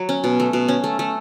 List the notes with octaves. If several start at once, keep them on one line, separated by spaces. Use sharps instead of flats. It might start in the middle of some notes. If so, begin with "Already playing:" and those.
Already playing: F#3
C#4
B2
A3
B2
C#4
A3
A3